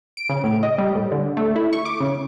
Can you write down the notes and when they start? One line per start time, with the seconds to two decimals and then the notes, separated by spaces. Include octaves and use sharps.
0.17 D7
0.29 C#3
0.44 A2
0.63 D#5
0.78 G3
0.95 A2
1.12 D3
1.37 A3
1.56 E4
1.73 C#6
1.85 D6
2.00 C#3